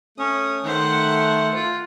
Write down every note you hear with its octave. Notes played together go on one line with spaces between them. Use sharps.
A3 C#4 D#6
D#3 A3 C5 F#5
F4